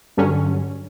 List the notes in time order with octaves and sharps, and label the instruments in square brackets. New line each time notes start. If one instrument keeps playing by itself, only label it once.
[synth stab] G2 D3 F#3 C#4